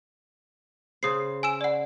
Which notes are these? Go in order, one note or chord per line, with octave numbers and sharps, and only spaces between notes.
C#3 C5 D#6 C7
G#5 E6 E7
D5 F#5